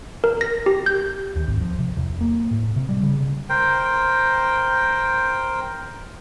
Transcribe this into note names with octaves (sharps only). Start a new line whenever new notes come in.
A#4
A#6
G4
G6
D#2
G#1
F3
C3
E2
A#3
A2
C3
G3
C#3
A#4 C5 G5